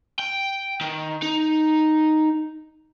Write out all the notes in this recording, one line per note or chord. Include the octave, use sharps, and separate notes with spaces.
G5
D#3
D#4